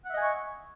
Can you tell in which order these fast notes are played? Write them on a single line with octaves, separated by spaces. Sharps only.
F#5 E5 D#5 G#5 C#6